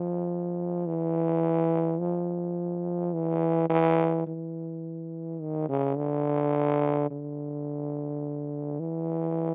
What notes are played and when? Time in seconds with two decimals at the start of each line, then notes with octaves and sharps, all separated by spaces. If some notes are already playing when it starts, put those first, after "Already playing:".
Already playing: F3
0.87 E3
2.00 F3
3.13 E3
3.70 E3
4.27 E3
5.41 D#3
5.69 C#3
5.97 D3
7.11 D3
8.80 E3